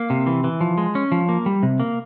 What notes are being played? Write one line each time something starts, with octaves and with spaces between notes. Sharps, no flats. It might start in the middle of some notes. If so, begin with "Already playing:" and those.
Already playing: A#3
C3
E3
E3
F3
G#3
C#4
F3
A#3
G3
C3
A#3